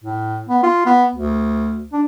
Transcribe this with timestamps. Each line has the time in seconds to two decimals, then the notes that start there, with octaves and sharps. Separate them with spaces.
0.04 A2
0.49 B3
0.63 F4
0.86 B3
1.15 D2
1.93 D4